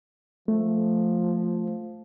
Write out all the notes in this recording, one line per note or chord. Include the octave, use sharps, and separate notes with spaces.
F3 A3